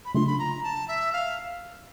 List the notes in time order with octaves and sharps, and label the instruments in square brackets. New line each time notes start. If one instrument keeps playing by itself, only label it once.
[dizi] B5
[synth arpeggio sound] C#3 F#3 A3 D4 F4 [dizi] C6
[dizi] B5
A#5
A5
E5
F5